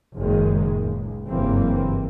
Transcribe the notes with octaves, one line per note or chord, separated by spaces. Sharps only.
F#1 F#2 A#2 D#3 G#3
C#2
F#1 G2 E3 A#3 C4